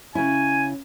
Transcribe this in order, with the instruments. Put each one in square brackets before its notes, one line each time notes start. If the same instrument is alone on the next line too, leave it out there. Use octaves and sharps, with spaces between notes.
[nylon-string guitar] C#3 E4 [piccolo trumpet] G#5